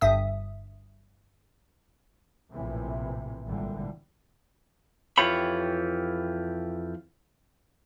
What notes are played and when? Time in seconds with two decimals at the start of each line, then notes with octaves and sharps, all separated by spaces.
0.01 G1 G2 E5 D#6
2.52 A#1 A2 C3 E3
3.46 G#1 A#2 D3 E3 G3
5.18 F2 E3 F4 G4 C#5 B5